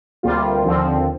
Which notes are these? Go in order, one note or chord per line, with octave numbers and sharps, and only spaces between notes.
D2 C3 G3 A#3 F4
D#2 D3 F3 C4